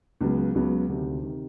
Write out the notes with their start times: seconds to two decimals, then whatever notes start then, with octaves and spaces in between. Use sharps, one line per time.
0.21 C#2 C#3 F#3 B3
0.55 C#2 C#3 F#3 B3
0.89 D2 C3 D#3
1.24 C3 D#3